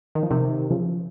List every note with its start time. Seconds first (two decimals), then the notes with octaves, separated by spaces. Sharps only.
0.15 D#3
0.23 F3
0.30 C3 D#3
0.70 C#3 F3